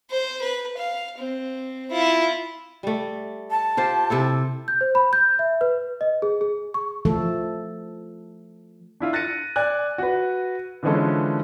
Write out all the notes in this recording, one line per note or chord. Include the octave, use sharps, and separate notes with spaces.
C5
B4
F5
C4
E4 F4
G3 A3
A5
F4 G4 C5
C3 E4 A4
G6
C5
B5
G6
E5
B4
D#5
G#4
G#4
C#6
F3 A3 A4
D4 E4 F4
F#6 A6 A#6 C#7 D#7
D5 G#5 F#6
F#4 B4
D3 E3 F3 G#3 C#4 A4